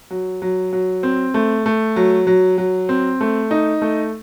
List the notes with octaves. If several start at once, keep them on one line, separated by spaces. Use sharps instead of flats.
F#3
F#3
F#3
C4
A3
A3
F#3
F#3
F#3
C4
A3
D#4
A3